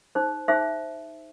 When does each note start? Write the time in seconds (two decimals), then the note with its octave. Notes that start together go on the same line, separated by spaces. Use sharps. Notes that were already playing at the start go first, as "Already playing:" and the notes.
0.15 D#4 G#4 C5
0.48 D#4 G#4 C5 E5